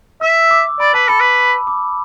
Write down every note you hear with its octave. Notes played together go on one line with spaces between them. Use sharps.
E5 E6
D6
D5 B5
B4 A5
A4 B5
B4
D6